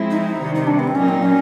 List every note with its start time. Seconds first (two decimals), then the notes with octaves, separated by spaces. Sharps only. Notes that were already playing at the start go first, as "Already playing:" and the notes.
Already playing: F3 G#3 C4 E4
0.11 D#4
0.39 C3 D#3 G3
0.55 D#4
0.67 D4
0.79 B3
0.87 C4
0.95 A#2 F#3 A#3 C#4 D#4
1.08 C4
1.22 C#4